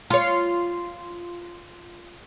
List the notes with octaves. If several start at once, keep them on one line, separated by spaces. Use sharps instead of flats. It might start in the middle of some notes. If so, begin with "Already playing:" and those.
F4 C#5